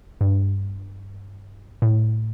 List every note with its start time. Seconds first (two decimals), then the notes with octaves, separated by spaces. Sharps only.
0.21 G2
1.82 A2